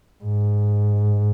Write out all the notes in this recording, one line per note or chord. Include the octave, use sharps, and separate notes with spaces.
G#2